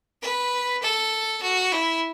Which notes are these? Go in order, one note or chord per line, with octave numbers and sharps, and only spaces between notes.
B4
A4
F#4
E4